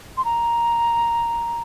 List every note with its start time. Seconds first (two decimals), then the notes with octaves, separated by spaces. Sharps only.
0.17 C6
0.25 A#5